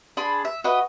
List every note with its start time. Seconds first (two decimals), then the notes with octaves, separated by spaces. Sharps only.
0.17 D4 G#4 B5 C6
0.45 E5
0.64 F#4 B4 D#5 E5